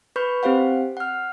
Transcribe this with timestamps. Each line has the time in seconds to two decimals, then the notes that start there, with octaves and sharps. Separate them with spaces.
0.16 B4 B5 C#6 G6
0.43 C4 G4 C5 F5 F#5
0.97 F#5 F6